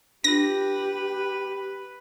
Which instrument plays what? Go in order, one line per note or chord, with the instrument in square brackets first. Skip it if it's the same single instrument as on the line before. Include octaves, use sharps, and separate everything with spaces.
[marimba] D4 F4 [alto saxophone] G4 [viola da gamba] B4 [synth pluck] A#6